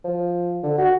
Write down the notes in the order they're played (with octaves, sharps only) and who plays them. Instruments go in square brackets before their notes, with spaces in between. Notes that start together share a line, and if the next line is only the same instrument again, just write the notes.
[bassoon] F3
D3
F#4